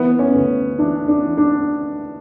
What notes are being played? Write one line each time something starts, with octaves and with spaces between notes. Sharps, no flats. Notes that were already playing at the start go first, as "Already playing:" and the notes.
Already playing: E3 B3
C#4
D2
E3 D4
D4
E3
D4